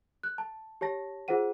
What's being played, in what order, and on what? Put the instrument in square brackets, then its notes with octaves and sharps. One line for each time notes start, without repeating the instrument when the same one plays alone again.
[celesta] F#6
A5
G4 C#5 A5 A#6
F4 G#4 C5 F#5 D#7